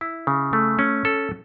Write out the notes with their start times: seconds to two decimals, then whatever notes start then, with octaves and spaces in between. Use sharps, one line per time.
0.01 E4
0.27 C#3
0.53 A3
0.79 C#4
1.05 A4